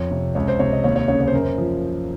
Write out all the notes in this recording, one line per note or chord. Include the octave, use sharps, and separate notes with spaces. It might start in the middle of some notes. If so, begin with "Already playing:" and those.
Already playing: F2 C#5
C3
C#2 C#5
C5
C3 C#5
D#5
D#2 C#5
C#5
C#3 C#5
C#5
C5
F#2 A#4
C5
F3